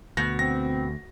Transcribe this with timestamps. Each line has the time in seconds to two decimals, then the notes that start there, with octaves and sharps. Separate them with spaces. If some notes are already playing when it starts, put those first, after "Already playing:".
0.17 D2 B2 A#6
0.39 C4 A#6